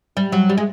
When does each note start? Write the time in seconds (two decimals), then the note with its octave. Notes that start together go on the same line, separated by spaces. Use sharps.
0.17 G3
0.32 F#3
0.50 G3
0.58 G#3